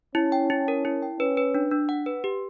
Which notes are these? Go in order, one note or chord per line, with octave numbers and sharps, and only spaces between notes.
C#4 E4
G5
E4
A#4
E4
G5
C#4 B4
B4
D4
D4
F#5
B4
G4